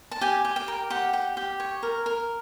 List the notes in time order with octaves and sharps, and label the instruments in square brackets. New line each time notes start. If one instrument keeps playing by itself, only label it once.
[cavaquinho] A5
G4 G#5
G4
G5
A#4
G4 F#5
G4
G4
C#5
A#4
A#4